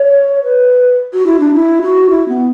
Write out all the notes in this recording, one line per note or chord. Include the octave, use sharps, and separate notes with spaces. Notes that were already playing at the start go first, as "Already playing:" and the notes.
Already playing: C#5
B4
F#4
E4
D4
E4
F#4
E4
B3